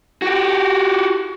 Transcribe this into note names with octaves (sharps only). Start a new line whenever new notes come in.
F#4 G4